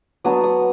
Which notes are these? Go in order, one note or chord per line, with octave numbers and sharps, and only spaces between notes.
F#3 B3 D4 D#6
D#6